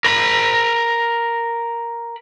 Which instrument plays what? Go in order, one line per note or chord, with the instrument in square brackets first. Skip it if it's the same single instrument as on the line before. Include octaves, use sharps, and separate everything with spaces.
[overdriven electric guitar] A#4 B5